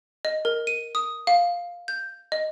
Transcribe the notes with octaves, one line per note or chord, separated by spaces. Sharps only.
D#5
A#4
D#7
D#6
F5
G6
D#5